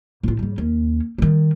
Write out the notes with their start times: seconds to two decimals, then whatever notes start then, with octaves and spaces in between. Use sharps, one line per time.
0.23 A2 F4
0.39 G#2 G3
0.58 D#2 C#4
1.18 D#3 G3